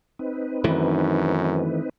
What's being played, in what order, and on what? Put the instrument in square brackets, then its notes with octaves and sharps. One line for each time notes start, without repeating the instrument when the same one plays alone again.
[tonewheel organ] C4 D#4 B4
[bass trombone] F#2 [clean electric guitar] D#3 E3 A3